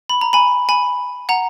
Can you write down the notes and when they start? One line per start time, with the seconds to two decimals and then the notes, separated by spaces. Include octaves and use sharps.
0.10 B5
0.21 A#5
0.33 G#5 B5
0.69 G#5 B5
1.29 F#5 A#5